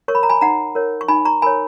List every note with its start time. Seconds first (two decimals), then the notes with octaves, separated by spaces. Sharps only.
0.08 A#4 C#5 C#6
0.15 B5
0.23 A#5
0.29 G#5 B5
0.41 D#4 F#5 A#5
0.75 A#4 C#5
1.01 C#6
1.08 D#4 G#5 B5
1.25 A#5 C#6
1.42 A#4 C#5 G#5 B5